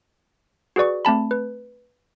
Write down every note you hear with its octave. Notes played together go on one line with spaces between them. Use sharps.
F#4 G#4 B4 D5 C#6
A3 C4 A5 B5
B4